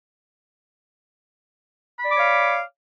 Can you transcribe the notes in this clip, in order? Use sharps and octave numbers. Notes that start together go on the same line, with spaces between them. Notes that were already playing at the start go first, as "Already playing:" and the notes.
C#5 D5 F5 B5 D6